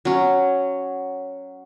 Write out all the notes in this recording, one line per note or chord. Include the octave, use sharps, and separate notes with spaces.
F#3 C#4